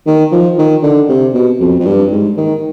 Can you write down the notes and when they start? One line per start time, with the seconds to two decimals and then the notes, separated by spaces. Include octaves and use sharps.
0.06 D#3
0.32 F3
0.58 D#3
0.83 D3
1.09 C3
1.34 B2
1.60 F2
1.80 F2
1.86 G2
2.11 G#2
2.37 D#3